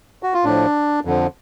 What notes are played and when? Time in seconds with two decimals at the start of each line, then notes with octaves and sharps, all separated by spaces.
0.23 F#4
0.34 F4
0.45 A2 F3 D4
1.05 F2 D3 F3